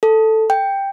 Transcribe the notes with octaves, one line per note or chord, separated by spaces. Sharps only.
A4
G5